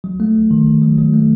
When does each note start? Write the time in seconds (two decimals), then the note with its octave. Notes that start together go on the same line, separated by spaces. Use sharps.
0.04 F#3
0.20 A3
0.35 F#3
0.51 D#3
0.67 D#3
0.82 F#3
0.98 F#3
1.13 A3